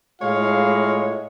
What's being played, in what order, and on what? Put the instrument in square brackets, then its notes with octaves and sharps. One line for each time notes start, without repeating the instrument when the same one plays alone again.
[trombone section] A2 F4 [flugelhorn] G#3 [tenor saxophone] C#5 [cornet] F5